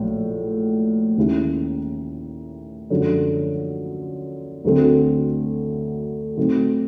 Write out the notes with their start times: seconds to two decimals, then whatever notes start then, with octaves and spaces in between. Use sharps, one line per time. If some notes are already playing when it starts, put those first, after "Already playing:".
Already playing: A#1 A2 F#3
1.18 D#2 D#3 G#3 C#4 E4
2.90 F#2 D3 F3 G#3
4.64 D2 D3 F#3 A3 C4
6.37 A2 F#3 A3 C4 D#4